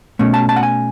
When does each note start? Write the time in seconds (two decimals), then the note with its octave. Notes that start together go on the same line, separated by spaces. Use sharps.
0.19 B2 A3 C#4
0.34 A5
0.49 A5
0.56 F#5
0.63 G#5